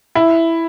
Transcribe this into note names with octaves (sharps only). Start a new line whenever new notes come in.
E4